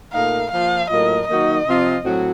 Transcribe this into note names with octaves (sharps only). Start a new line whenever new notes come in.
A#2 A3 D#4 A#4 F5
F3 A#3 F4 F5
A2 F#3 A#3 F4 A#4 D#5
D#3 F#3 A#3 D#4 F#4 D#5
C3 F3 C4 F4
A2 F#3 C4 F#4